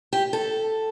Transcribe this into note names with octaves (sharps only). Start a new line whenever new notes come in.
G4
A4